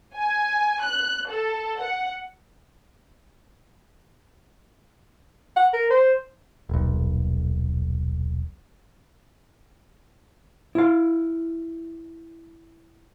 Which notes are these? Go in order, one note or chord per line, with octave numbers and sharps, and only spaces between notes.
G#5
F#6
A4
F#5
F#5
A#4
C5
D#1 B1
E4 F5